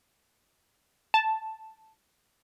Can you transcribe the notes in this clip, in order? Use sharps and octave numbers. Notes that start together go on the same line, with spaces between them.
A5